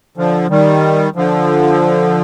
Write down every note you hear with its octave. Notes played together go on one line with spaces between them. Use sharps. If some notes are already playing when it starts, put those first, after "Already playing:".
D3 F3
D#3 G3
D3 F3